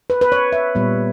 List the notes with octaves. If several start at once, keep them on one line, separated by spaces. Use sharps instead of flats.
B4
B4
C#5
E5
A#2 G3 B3